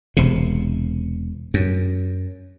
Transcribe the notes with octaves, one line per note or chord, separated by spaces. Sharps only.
E1 C3
F#2